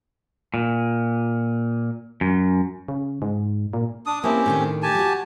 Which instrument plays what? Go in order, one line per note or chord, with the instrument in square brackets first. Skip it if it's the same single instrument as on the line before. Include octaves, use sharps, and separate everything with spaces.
[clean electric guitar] A#2
F#2
[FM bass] C#3
G#2
A#2
[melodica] D4 D#6
[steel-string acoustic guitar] A#3 E4 [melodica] C4 C#4 G4
[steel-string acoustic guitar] A2 D#3 D4
[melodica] G4 G#5 A5
[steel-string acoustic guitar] G3 F#4